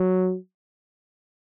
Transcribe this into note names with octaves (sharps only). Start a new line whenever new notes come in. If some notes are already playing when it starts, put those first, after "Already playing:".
Already playing: F#3